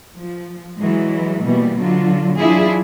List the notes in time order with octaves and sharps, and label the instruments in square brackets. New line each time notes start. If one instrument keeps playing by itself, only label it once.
[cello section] F3
E3 F#3 G#3
B2 E3 G3 A#3
D3 F#3 F4
E3 F#3 D4 E4 F4 G#4